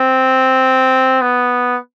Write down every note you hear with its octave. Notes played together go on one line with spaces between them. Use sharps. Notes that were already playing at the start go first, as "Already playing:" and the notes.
Already playing: C4
B3